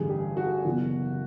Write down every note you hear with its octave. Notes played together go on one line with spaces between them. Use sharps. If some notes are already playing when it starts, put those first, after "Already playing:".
Already playing: A1 G2 D3 G#4
G4
F#4
F#1 E2 B2 F#3